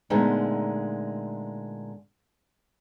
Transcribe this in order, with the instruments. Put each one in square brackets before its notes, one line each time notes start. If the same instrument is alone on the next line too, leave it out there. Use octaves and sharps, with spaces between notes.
[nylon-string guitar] A#2 D3 G#3 A3 B3 D#4